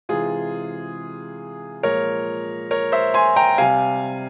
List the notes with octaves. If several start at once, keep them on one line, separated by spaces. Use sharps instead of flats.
C3 E3 G#3 F4 G#4
A#2 F3 G#3 A#4 C#5
A#4 C#5
C5 E5
G#5 C6
G5 A#5
C3 G3 F5 G#5